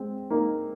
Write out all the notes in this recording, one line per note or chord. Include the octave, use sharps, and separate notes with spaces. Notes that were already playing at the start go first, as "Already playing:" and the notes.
Already playing: G#3 C4
A#3 D#4